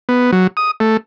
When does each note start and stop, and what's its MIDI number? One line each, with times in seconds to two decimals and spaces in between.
0.09 0.31 59
0.32 0.47 54
0.57 0.71 87
0.80 0.97 57